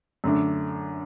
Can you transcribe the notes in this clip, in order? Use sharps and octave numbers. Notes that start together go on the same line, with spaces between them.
F#2 D3 A3 D4